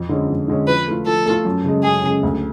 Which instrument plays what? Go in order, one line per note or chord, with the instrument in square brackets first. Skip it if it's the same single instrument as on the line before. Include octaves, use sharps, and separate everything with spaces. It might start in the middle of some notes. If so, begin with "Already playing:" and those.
Already playing: [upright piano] F2
D3 G#3 C#4
F2
D3 G#3 C#4
[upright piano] F3 [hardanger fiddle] B4
[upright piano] A3 F4
[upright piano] F3 [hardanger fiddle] A4
[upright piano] A3 F4
F#2
C#3 G#3
[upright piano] F#2 [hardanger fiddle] G#4
[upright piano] C#3 G#3
D2